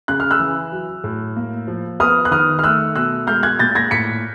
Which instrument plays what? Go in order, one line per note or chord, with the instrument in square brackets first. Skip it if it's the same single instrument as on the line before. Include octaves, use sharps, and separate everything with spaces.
[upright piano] C#3 F#6
F6
E6 F#6
E3
F#3
A2
A#3
F3
B3 D#6 F6
F#6
D#3 D#6 F6
F6
A3 E6 F#6
B2 E6 F#6
G#3 F6 G6
F#6 G#6
A#2 G6 A6
G#6 A#6
A2 B6 C#7